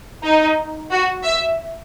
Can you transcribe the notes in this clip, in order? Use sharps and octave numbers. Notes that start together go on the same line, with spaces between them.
D#4
F#4
E5